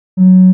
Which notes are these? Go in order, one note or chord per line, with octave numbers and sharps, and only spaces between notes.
F#3